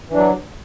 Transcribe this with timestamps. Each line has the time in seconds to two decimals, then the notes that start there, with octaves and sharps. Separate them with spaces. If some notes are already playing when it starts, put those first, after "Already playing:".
0.10 E3
0.13 D4
0.16 F#3